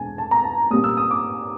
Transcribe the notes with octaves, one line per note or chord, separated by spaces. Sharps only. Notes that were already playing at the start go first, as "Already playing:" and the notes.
Already playing: E2 B2 G#3 B3 D4 G#5 A5
A5
A#5
A5
A#2 G3 A#3 C#4 D#6
E6
D#6
D6